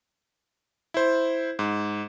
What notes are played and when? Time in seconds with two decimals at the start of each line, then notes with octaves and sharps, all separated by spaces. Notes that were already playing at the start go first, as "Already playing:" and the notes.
0.94 E4 C5
1.59 G#2